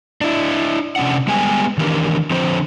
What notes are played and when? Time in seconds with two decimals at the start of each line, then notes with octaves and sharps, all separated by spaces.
0.21 D4 E4
0.96 C3 C#4 D4 F#5
1.27 G3 G#3 B3 G4 G#5
1.78 D#3 E3 D4 G4 A#4
2.31 D3 F3 C4 C5